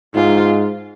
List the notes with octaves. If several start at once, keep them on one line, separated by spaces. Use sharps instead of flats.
G#2 F4